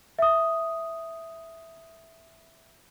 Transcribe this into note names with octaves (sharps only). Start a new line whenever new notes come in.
E5 D#6